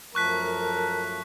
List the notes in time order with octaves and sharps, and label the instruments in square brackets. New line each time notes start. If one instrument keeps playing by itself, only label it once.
[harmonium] F#2 F3 A3 [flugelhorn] A#4 [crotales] C#6 F#6 B6